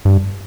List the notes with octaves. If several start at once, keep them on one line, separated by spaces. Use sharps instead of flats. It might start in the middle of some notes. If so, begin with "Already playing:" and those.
G2